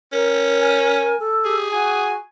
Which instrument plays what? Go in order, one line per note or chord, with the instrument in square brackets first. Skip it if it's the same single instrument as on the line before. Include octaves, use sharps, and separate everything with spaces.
[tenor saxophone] C#4 [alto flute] A#4
[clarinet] G#5
[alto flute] A4
[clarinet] G4 [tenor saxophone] G#4
[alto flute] F#4 [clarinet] G#5